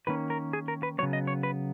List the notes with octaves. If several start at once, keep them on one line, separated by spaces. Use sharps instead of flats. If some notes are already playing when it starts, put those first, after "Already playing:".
D#3 A#3 C#4 B4
A#4
G#4
A#4
B4
C#3 F#3 B3 C#5
D#5
C#5
B4